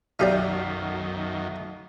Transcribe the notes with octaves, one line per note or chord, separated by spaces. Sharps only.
B1 F#2 D#3 D#4 G4 D5 E5 F5